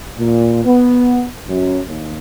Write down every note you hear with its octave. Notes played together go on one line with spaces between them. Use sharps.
A#2
B3
F#2
D#2